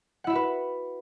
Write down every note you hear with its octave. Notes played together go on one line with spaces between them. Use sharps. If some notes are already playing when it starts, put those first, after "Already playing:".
E4 F#4 B4 E5 F#5